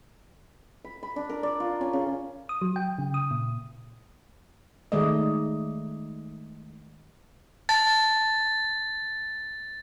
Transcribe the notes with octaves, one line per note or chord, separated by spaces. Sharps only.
B5
B5
D4
A#4
D5
F4
C#4
C#3
D#6
F#3
G5
C#3
D#6
A#2
D#3 G#3 A3 D5 D#5
A5 A6